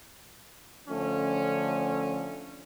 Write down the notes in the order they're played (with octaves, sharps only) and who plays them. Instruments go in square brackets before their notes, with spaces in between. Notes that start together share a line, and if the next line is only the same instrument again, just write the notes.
[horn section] D3 F3 A3 C#4